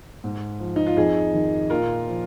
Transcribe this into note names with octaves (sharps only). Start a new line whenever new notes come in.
G#2
F3
D#4
F4
F2 D#4 G#4
D#3
A#2 F4 A#4
F3